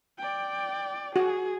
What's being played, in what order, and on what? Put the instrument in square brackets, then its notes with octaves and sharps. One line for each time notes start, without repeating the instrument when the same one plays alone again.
[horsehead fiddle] D5 G5
[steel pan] F#4 [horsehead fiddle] G#4